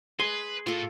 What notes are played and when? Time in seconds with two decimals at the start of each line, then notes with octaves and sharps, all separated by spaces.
0.19 G#4 B4 G#5 C6
0.67 A2 F4 A4